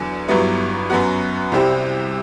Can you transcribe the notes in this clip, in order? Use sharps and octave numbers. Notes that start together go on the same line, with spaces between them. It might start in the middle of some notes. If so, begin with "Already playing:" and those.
Already playing: E2 D3 F#3
G1 G2 F#3 B3 E4
F#2 F#3 B3 F#4
C2 C3 G3 C4 G4